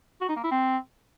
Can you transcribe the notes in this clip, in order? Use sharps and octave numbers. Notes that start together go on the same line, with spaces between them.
F#4
D#4
A#3
E4
C4